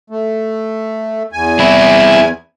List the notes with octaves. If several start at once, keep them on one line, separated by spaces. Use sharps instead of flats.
A3
E2 G#5
C4 E4